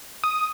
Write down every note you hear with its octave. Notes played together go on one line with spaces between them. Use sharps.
D#6